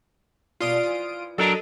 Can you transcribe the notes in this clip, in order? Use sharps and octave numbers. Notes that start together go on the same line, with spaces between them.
B2 G3 A#3 F4 D#6 D7
E3 F3
F#3 D4 A4 A#4 D#5